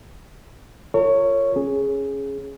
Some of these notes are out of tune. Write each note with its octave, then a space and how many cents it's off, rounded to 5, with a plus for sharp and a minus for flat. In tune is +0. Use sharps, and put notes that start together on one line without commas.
F4 +0 A#4 -45 C#5 +0
C#4 -15 G#4 +0